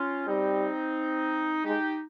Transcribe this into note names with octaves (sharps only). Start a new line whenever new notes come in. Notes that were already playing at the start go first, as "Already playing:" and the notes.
Already playing: C#4 F4
G3 C4 D#4
G#3 D#4 G4